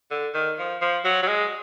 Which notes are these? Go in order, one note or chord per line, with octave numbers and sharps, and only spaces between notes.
D3
D#3
F3
F3
F#3
F#3
G#3